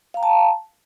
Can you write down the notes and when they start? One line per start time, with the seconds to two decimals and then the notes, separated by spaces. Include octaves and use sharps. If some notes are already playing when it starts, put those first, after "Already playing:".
0.14 F5
0.17 A#5
0.20 G5
0.23 A5